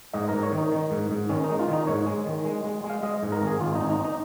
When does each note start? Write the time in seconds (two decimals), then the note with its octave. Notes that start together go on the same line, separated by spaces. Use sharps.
0.13 G#2 D#5
0.29 G#2 A#4
0.43 C#5
0.52 D#3
0.58 D#4
0.72 D#3
0.91 G#2
1.11 G#2
1.29 D#3 C#4
1.44 G#3 D#4
1.59 F4
1.68 D#3
1.73 D#4
1.87 G#2 C#5
2.07 G#3
2.26 D#3
2.45 G#3
2.64 G#3
2.84 G#3
2.90 F5
3.03 G#3 D#5
3.23 G#2
3.32 A#4
3.41 G#1
3.47 G#4
3.60 G#1 F4
3.75 D#4
3.80 G#1
3.90 D#4
4.04 D#4